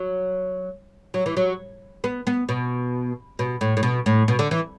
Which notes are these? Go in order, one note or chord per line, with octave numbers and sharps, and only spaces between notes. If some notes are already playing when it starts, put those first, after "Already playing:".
Already playing: F#3
F#3
E3
F#3
B3
B3
B2
B2
A2
A2
B2
A2
B2
D3
E3